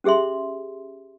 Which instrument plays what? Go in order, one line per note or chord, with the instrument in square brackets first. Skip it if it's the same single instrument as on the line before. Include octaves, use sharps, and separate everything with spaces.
[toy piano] C#4 G4 G#4 E5 C6